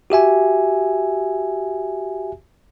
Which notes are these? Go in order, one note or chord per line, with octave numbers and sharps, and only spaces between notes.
F#4 G4 E5 G#5